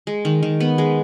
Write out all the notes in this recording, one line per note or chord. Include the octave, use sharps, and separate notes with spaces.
G#3
D#3
D#3
B3
G#3